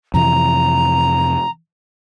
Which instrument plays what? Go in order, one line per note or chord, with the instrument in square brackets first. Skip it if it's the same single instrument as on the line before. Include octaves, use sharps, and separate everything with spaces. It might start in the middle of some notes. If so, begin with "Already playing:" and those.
[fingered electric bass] F2 C3 E3 [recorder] A#5